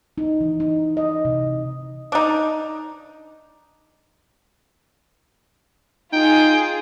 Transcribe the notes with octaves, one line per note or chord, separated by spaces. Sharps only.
D#4
E3
D#4
D#5
C3
D4 D#4
D#4 F4 G#4 G5